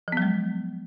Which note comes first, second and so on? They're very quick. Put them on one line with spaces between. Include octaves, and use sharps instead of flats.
F3 B3 F#3 G#3